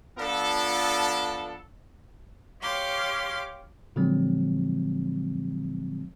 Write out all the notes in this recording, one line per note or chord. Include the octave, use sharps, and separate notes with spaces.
F3 B3 D4 F4 A4
G4 C#5 F5 C6 D6
A#2 D3 F3 F#3 G#3 C4